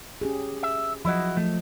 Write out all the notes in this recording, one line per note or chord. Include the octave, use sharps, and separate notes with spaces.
C#4 G4 G#4
E5
F3 F#3 E4 F#4 D#5
F3 A3